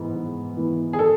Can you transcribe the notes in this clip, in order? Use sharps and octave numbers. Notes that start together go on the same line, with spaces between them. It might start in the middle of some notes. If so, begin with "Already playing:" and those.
Already playing: G#2 E3 B3
G#2
E3 B3
G#4
A4